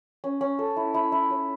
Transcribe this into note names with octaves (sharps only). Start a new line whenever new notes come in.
C#4
C#4
A4
E4
E4
E4
C#5